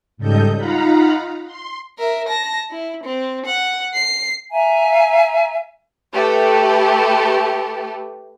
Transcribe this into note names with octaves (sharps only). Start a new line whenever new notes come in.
G#2 C#3 G3 A4 D#5 G6
D#4 F4 F5 F#5 A#5 B5
C6
A#4 E5
A5 A#6
E4
C4
F#5
C7
E5 F5 G#5 A#5
A3 G4 A4 B4